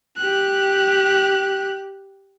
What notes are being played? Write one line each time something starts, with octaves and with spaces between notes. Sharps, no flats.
G4 F#6